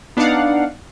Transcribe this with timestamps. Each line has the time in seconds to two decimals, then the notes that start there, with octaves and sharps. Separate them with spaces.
0.17 B3 D4 D#4 D5 F5 F#5